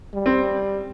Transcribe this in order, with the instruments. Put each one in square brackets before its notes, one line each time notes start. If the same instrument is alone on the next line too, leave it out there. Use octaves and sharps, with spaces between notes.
[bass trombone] G3
[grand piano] C4